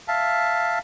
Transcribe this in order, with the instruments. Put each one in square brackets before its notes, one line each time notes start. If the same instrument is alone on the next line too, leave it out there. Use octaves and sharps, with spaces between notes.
[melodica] E5 F5 A5